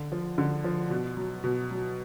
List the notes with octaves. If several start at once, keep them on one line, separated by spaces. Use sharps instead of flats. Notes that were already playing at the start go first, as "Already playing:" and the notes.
Already playing: D3
F3
D3
F3
B2
F#3
B2
F#3